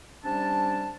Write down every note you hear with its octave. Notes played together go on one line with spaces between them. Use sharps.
C3 G3 C#4 D4 A5